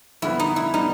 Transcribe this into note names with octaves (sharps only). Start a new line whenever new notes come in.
F2 D3 G3 B3 E4
D#4
E4
D3 G3 B3 D#4